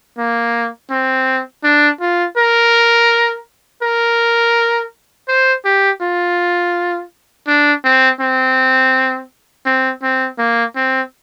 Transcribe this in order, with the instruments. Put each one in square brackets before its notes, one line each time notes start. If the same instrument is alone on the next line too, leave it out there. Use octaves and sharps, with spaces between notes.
[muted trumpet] A#3
C4
D4
F4
A#4
A#4
C5
G4
F4
D4
C4
C4
C4
C4
A#3
C4